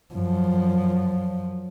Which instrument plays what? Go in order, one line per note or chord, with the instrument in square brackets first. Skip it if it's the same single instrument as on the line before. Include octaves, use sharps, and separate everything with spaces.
[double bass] F#2 F3